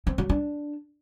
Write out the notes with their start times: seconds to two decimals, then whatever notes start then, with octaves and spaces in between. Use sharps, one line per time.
0.07 C4
0.18 F#3
0.30 D4